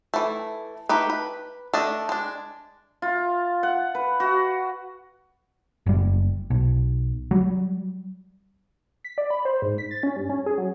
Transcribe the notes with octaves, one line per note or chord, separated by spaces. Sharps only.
E3 A3
A3 D#4 G4 B4
B4
A3 D4 D#5
G#3 D4
F4
F#5
B4
F#4
F#1 G3
B1
F#3 G3
B6
D5
B5
C5
G#2
B6
A6
C#4
G2
C#4
G#4
F#3